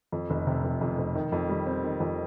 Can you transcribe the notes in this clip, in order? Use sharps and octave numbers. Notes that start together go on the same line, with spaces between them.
F2
F1
C3
F1
F2
F1
D#3
F2
G3
C4
D#3
F2